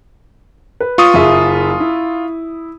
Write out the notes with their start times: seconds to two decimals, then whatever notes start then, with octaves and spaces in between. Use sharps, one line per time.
0.80 B4
0.98 F4 C#6 D#6
1.14 F#1 G#4 E5
1.80 E4